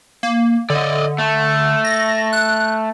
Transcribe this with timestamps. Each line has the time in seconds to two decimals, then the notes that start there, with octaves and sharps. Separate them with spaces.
0.23 A#3
0.70 D3 D5 D#5
1.18 A3
1.85 A#6
2.33 F#6